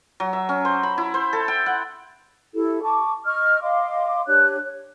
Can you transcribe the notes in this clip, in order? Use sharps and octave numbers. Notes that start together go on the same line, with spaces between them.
F#3
E5
C#4
C5
B5
E4
C5
A4
G5
F#5
E4 G4 A4
A5 C#6 D6
D#5 C#6 F6
D#5 F5 C6 D6
D4 G4 C#5 F#6
C#5